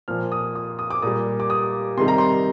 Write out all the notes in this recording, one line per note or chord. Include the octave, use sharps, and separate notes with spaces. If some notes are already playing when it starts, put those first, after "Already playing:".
A#2 F3 F6
D#6
D#6
D#6
D6
A#2 G3 D#6
D6
D#6
C3 D#3 G3 C6
A#5
C6